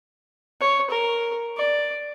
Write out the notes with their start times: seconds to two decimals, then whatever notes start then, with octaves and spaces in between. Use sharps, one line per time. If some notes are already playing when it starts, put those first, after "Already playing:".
0.60 C#5
0.90 A#4
1.57 D5